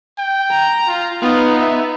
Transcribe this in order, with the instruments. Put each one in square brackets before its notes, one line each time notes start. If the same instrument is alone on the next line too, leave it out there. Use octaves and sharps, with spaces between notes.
[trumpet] G5
[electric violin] A#5
[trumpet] F4
[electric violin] B3 D#4 [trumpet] F4
[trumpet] E5